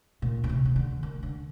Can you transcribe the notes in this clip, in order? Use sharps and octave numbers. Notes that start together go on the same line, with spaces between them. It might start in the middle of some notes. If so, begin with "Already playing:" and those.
A#2
D3
C3
C3
D3
D#3
D3